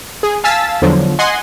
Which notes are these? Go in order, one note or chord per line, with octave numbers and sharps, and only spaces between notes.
G#4
F5 G#5 A5 E6 A6 B6
E2 D3 F3 F#3
D#5 F#5 G#5 C6